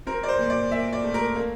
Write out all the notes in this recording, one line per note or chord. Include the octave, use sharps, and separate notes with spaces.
C4 A#4
D5
C5
A#2
D5
A#2 E5
D5
A3
A#4
A#3